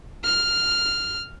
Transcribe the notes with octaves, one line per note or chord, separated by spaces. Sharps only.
F6